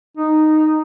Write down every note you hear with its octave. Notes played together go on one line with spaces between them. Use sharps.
D#4